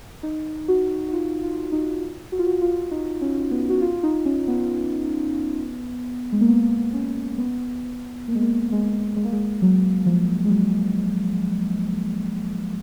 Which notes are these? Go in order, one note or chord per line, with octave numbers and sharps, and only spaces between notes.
D#4
F#4
F#4
F4
F4
D#4
F#4
F4
F#4
F4
D#4
C#4
B3
F#4
F4
D#4
C#4
B3
G#3
A#3
B3
C#4
B3
A#3
G#3
A#3
G#3
G#3
A#3
G#3
F#3
F3
G#3
F#3